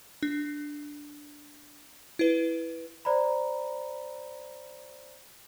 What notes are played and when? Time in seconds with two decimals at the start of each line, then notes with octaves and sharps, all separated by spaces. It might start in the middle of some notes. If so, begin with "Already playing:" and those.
0.23 D4
2.19 E4 B4
3.05 C5 D5 A#5 B5